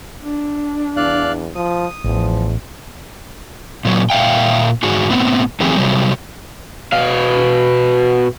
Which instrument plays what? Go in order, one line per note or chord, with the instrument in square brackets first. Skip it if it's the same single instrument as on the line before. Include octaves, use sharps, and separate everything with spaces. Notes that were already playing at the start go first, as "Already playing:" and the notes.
[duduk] D4
[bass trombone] E2 [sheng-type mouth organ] D5 F5 F#6
[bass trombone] F3 [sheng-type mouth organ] D#6
[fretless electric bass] A1 [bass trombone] E2 [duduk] F3
[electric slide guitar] A#2 F#3
A#2 E5 F5 G5
G#2 F#4 G#4
A2 B3 C4
D#3 F3 A3 C4 G4 G#4
C3 F#3 G3
[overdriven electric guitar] B2 F5